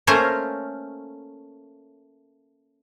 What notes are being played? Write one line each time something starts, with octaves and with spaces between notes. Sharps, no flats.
A3 A#3 C#4 A#4 C5 C#5